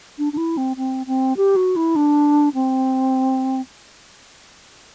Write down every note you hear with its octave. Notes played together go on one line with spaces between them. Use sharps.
D4
D4
E4
C4
C4
C4
G4
F#4
E4
D4
C4